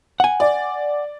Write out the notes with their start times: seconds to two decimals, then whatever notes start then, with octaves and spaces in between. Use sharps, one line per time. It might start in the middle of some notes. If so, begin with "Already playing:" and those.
0.20 F#5 G#5
0.40 D5